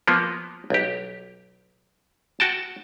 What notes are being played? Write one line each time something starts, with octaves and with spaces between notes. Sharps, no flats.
F3 A#3 B3
B1 G4
F#4 G5 A5